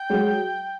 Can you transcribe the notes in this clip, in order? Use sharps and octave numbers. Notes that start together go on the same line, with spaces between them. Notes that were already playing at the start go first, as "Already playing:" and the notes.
Already playing: G5
F#3 G#3